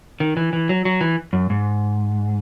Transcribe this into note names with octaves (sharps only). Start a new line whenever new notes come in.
D#3
E3
E3
F#3
F#3
E3
F#2
G#2